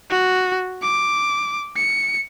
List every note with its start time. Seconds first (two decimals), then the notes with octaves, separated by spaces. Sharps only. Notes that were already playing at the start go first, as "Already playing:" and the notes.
0.10 F#4
0.82 D6
1.77 C#7